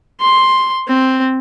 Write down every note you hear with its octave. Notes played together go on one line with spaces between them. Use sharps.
C6
C4